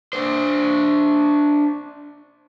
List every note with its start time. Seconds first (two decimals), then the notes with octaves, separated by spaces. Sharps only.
0.13 D4 C5